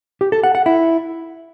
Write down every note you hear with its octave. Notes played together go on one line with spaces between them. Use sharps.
G4
A4
F#5
F#5
E4